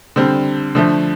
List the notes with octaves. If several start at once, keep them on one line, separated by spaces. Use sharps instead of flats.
D3 G3 C4
D3 F3 A3